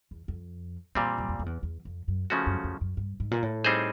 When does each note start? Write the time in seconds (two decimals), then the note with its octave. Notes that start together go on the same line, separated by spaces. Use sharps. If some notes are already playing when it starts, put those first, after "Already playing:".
0.11 E2
0.28 F2
0.95 E2 A#2 G3 C4
1.18 F#2
1.29 F2
1.39 F2
1.46 E2
1.63 E2
1.85 F2
2.08 F#2
2.30 C#3 F3 A3 C#4 F#4
2.46 F#2
2.64 F2
2.81 F#2
2.97 G2
3.20 G#2
3.31 A#2
3.43 A2
3.64 G3 C4 D#4 G#4 C5